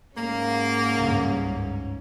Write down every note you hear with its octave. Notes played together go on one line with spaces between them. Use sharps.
G#2 A#3 C#4
C#2 G2